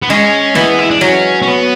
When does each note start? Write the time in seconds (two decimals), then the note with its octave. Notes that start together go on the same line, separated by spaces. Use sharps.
0.02 B3
0.09 G#3 C#4
0.55 E3 B3
0.79 E4
0.90 D4
1.01 F#3 C#4
1.42 C#4
1.48 B3